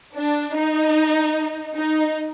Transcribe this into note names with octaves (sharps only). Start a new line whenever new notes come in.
D4
D#4
D#4